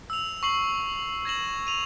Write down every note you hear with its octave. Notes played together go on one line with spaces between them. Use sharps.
E6 F7
C#6 C7 F#7
G#6 A#6 E7 F#7
D#7 F7